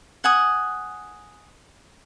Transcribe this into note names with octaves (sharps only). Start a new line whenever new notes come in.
F#5 G#5 D#6